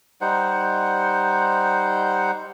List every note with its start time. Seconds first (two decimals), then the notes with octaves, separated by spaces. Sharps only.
0.21 G3 D#4 C5 F#5